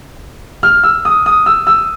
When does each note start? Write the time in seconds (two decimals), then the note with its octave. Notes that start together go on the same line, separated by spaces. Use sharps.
0.63 F6
0.84 E6
1.05 D#6
1.26 D#6
1.46 E6
1.67 E6